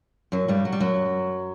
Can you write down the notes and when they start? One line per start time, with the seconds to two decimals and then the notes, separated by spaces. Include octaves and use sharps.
0.32 F#2 F#3
0.48 G2 G3
0.65 F#3
0.72 G3
0.80 F#2 F#3